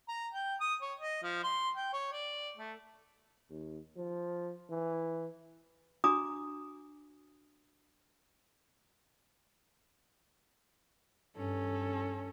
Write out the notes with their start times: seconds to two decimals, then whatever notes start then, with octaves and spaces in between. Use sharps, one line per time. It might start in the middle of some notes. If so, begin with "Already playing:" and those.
0.08 A#5
0.33 G5
0.61 D#6
0.82 C#5
0.99 D#5
1.23 F3
1.43 C6
1.76 G5
1.93 C#5
2.12 D5
2.58 A3
3.50 D#2
3.97 F3
4.70 E3
6.04 D4 F#4 G#5 A#5 D6 D#6
11.37 G2 C#4 A4